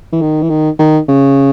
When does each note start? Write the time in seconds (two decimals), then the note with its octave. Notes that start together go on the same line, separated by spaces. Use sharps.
0.13 E3
0.22 D#3
0.42 E3
0.50 D#3
0.79 D#3
1.09 C#3